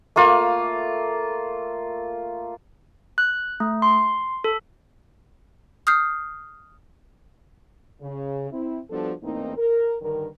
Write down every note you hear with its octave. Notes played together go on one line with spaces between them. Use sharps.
A3 A#3 F4
F#6
A3
C6
A4
D#6 F6 G6 C7
C#3
C4 E4
F3 G3 B3 D4 F#4 A4
E2 A2 A#3 C4 D#4
A#4
G2 D3 D#3 A#4